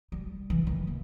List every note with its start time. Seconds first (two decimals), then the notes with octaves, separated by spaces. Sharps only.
0.12 G3
0.50 E3
0.67 D#3
0.87 A#3